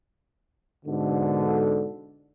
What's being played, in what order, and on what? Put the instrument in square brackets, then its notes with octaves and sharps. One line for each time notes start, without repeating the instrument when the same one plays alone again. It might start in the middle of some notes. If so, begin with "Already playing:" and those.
[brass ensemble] G#2 B2 D3